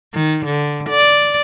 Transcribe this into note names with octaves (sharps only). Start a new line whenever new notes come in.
D#3
D3
D5